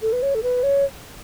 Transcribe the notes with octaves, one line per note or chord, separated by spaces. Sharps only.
A4
B4
C#5
A4
B4
C#5